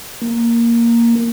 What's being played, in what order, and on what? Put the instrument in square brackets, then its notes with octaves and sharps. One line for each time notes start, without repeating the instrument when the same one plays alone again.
[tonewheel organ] A#3